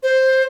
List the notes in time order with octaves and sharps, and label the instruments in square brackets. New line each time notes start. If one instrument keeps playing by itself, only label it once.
[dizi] C5